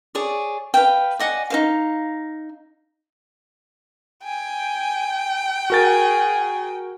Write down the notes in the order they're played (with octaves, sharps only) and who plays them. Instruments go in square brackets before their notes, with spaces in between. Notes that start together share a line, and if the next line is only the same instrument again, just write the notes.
[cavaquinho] G#4 C#5 D5
B4 F5 G5
D5 D#5 F#5 G#5
D#4 C5 F5
[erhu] G5 [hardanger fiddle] G#5
[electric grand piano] F#4 A#4 A6 [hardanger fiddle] G#4